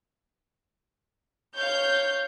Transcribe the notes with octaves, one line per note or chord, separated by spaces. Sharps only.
C#5 F5 G6